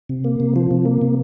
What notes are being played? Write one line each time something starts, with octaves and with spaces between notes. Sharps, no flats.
C3
A#3
C3
F3
C3
A#3
C3